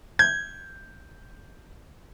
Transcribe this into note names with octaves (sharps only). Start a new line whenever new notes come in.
G6 G#6